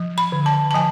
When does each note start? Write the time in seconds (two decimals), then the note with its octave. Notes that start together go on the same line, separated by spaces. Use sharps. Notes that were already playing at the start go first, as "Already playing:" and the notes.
Already playing: F3
0.18 B5
0.32 D3
0.46 A5
0.71 A5
0.75 F3 G#5